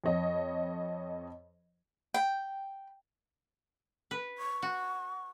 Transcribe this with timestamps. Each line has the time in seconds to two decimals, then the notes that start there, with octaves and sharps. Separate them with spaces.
0.04 F2 C#5 D#5
2.14 G5
4.11 B4
4.38 C#6
4.62 F#4